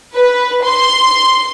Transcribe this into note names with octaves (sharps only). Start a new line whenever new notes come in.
B4
C6